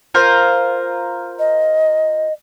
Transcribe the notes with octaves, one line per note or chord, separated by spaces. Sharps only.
F4 A#4 C5
D#5